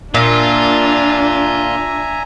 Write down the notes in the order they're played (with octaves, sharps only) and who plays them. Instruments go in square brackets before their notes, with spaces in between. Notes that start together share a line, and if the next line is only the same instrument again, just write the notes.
[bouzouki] A#2 [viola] D4 [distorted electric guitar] F4 [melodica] E5 G#5 A#5